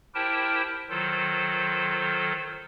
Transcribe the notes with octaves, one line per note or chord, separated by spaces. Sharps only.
E4 G4 A#4 C5 G5 A5
D#3 F#3 F4 A4 C5